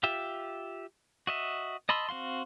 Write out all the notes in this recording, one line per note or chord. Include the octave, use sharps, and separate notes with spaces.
F4 G4 E5
F#4 D#5 E5
D#5 A5 B5 C6 E6
C4 F#4 F5 C6